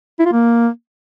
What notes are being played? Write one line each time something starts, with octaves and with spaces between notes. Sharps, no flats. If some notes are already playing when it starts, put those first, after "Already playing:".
E4
F4
A#3